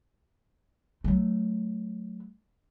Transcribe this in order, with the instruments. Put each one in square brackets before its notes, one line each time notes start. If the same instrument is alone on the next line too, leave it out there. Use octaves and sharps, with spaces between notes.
[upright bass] F#3 A3